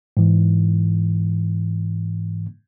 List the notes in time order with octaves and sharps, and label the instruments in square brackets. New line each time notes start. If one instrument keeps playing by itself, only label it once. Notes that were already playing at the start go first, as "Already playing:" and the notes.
[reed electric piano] G#2 E3